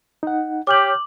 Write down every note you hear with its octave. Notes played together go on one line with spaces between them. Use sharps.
D#4 F#5
G4 C#5 D6 F6 G6 F#7